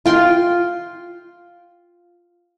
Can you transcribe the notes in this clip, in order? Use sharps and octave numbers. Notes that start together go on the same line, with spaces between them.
F4 G5 C6